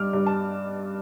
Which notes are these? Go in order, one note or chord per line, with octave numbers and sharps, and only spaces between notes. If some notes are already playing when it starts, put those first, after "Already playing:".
Already playing: G2 G3 D6 F6
G2 G3
A5